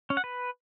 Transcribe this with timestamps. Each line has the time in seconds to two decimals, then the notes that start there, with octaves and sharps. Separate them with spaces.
0.10 C#4
0.17 F#5
0.24 B4